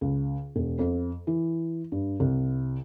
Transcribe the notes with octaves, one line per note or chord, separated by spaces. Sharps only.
C#2
E1
F2
E3
G2
C2